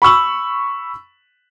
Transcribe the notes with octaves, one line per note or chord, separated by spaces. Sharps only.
B5 C#6 E6 F#7